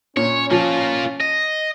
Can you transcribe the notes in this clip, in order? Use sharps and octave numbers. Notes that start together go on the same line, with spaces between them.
A#2 C#4 C#5
F3 A#3 F4
D#5